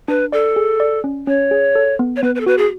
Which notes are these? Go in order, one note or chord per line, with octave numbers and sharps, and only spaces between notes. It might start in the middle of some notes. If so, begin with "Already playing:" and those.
D4 B4
A4 D5
G#4
D5
C#4
C#4 C#5
G#4
A4
B3
C#5
B3 B4
B4
A4
F#4 B4
G#4